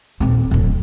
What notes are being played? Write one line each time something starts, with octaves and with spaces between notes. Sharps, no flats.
D#1 C4
D1 F2